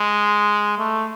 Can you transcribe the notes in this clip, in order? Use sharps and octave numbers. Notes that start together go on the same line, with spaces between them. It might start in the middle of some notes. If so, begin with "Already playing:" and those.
Already playing: G#3
A3